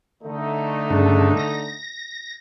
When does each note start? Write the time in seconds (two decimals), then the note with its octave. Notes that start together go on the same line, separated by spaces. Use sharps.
0.23 D3 A3 D#4
0.91 G2 C#3 D4
1.37 A#6